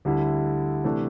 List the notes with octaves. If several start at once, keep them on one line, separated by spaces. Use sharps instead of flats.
D2 D3 G3 E4
C3 E3 A3 D4